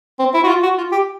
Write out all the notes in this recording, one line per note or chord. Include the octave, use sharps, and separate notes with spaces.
C4
E4
F#4
F4
F#4
F4
G4